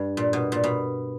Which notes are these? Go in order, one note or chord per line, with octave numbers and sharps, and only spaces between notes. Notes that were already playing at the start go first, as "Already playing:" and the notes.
Already playing: G2
A#2
B2
A#2
B2